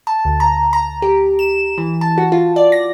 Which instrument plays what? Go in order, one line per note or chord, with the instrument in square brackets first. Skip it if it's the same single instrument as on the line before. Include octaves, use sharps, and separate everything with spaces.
[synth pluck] A5
D2
A#5
A#5
G4
E7
E3
A5
F#4
F4
D5
A#6